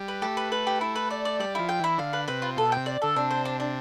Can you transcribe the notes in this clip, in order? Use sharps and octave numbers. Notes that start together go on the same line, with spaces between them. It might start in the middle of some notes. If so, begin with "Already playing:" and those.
Already playing: G3
B4
A3 G4
B4
B4
G4
E4
B4
D5
D5
G3 D5
F3 E4
G5
E3 E4
D3 F5
B4
C3 B4
F4
B2 A4
C3 G5
D5
D3 A4
C3 D4
C5
D4
D4